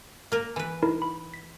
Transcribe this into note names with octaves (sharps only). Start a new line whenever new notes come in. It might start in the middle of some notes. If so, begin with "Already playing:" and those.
A#3 A#4
E3 B4 G#5
D#4 E4 A#4
B5
B6